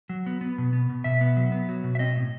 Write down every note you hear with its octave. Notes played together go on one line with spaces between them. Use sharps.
F#3
B3
B3
B2
B3
B2
B2 E5
B3
F#3
B3
F#3
B2
E5
C4 D#5
A2